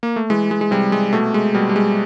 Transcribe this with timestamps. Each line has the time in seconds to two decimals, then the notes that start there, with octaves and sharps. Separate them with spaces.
0.03 A#3
0.16 A3
0.30 E3 G#3
0.51 G#3
0.61 G#3
0.71 C3 G3
0.92 G#3
1.13 B2 A3
1.34 G#3
1.55 B2 G3
1.69 G3
1.76 G#3